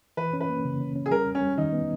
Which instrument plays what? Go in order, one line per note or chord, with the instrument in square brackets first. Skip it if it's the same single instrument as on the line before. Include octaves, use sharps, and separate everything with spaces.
[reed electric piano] E3 [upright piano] B4
[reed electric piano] C#4
[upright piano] B4
[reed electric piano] A#3
C#3
C#4
C#4
[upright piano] G#4
[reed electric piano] G3 [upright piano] A#4
[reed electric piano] E2
[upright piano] C#4
[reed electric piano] G3
[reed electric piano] D#3 [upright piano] D#4
[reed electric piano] B3